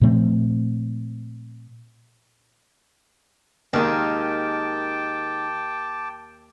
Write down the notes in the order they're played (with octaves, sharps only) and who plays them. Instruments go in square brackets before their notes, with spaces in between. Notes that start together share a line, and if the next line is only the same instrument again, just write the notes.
[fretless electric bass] A#2 F3 A3 C4
[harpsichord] D#2 [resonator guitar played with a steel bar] D#3 G#3 D#4 [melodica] G5 A5 D6